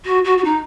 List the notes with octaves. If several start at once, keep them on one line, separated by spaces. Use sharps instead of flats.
F#4
F#4
F#4
D#4